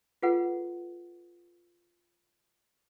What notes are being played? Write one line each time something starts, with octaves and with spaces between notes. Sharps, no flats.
F4 G#4 A4 B4 F#5